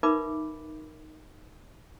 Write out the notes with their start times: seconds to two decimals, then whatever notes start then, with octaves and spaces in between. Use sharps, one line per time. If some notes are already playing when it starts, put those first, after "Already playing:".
0.03 D#4 A#4 B4 E5 B5 D6